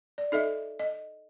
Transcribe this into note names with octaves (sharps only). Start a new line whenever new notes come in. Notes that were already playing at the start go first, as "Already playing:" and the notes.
D5
D#4 A4 D#5 E5
D#5